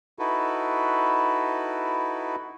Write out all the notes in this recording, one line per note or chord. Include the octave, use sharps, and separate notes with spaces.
D#4 E4 F#4 A4 B4